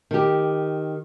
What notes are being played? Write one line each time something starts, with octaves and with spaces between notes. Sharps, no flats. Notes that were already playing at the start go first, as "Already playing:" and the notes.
D#3 G4